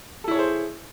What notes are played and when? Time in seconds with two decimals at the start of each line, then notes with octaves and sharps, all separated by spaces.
0.24 A4
0.28 E4
0.31 C#5
0.35 G#4
0.39 C5